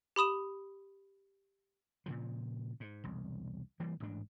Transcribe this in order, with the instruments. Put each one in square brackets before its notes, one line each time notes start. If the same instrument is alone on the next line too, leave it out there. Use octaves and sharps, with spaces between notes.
[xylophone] G4 B5 D#6 E7
[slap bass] A#2 C#3 F3
G#2
E1 C2
E3 G3 A#3
A1 G#2 D4